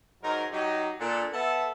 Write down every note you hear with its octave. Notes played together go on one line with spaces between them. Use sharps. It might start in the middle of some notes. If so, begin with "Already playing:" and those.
G#2 F#3 D#4 A#4
F#3 D#4 G4
A#2 D4 A4
B3 A4 E5 A5